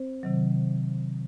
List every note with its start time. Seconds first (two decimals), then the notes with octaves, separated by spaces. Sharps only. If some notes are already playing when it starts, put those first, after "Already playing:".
Already playing: C4 C5
0.23 C3 D#3 F#3